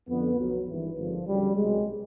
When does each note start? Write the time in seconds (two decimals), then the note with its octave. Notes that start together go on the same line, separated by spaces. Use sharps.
0.08 F2 D3 F3 B3
0.38 B1 B2 F#3
0.67 G#1 G2 E3
0.97 G#1 G2 D3 F3
1.27 D2 C#3 F#3 G3
1.56 C2 B2 F#3 G#3